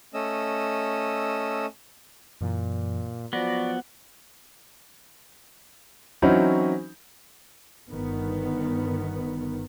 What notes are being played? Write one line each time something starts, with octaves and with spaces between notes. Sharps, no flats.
A3 C#4 D#5 E6
F#2 A#2 E3
F3 F#3 B3 F#4 D5 A#6
E3 F#3 C4 C#4 D#4 E4
G1 D#3 B3